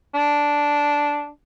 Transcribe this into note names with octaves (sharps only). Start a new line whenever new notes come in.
D4